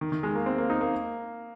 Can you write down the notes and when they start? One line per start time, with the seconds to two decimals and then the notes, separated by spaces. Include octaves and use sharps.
0.01 D#3
0.12 D#3
0.23 G#3
0.35 A#3
0.46 C4
0.58 A#3
0.70 D#4
0.81 A#3